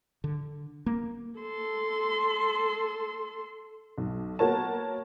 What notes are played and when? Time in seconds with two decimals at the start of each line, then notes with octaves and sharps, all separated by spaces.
0.24 D3
0.86 A#3
1.40 A4 C6
3.98 B1
4.39 A#3 B3 F#4 A#4 C#5 A5